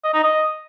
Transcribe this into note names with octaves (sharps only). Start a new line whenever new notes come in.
D#5
D#4
D#5